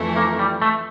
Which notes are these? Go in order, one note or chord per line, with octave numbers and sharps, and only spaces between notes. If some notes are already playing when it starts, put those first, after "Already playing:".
Already playing: F2 E3 A3 E4
A#3
G3
A3